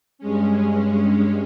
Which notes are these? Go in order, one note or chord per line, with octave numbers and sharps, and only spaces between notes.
G2 G#3 C#4